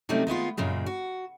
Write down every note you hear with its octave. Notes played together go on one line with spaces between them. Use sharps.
C3 F#3 G3 A3 C#4 D#4
D#3 G#3 B3 F4
F#2 A#2 C#3 G#3
F#4